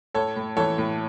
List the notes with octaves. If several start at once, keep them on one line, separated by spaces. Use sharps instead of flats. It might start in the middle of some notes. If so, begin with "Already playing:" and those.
A2 A4 C#5
A2
E3 A4 C#5
A2